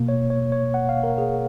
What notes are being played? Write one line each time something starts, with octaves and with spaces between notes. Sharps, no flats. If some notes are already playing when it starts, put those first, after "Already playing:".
Already playing: B2 A#3
C#5
C#5
C#5
F#5
F5
A#4
G#4